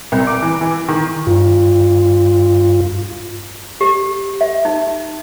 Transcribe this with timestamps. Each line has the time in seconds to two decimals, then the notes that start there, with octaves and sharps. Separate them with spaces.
0.12 C2
0.27 D6
0.42 E3
0.61 E3
0.89 D#3
1.27 G2 F4
3.81 G4
4.41 E5
4.65 D#4